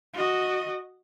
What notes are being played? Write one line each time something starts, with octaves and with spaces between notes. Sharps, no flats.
F#4 D#5